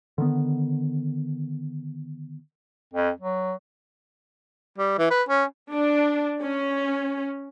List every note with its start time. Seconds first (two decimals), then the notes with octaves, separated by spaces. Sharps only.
0.18 D3 D#3 B3
2.93 F2
3.21 F#3
4.78 G3
4.98 E3
5.10 B4
5.29 C#4
5.72 D4
6.42 C#4